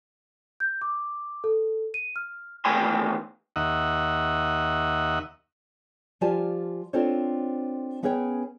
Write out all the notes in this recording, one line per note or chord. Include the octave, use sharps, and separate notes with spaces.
G6
D6
A4
D#7
F6
E2 D#3 A3 G5 G#5 C6
D#2 D#5 E5 F#5
F3 F4 G4 D5 G#5 A5
C4 D4 F4 A4 C5 C#5
B3 C#4 G#4 B4 C#5 G5